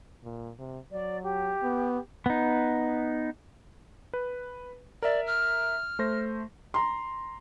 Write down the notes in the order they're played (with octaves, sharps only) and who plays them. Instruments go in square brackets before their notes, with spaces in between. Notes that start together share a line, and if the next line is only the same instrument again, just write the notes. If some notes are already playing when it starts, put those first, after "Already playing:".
[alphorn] A#2
C3
[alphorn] F#3 [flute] D5
[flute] G4
[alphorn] B3
[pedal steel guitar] B3 D#4
[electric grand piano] B4
[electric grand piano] A#4 E5 [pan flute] D5
[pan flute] F6
[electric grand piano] A3 C5 A#6
[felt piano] A#5 C6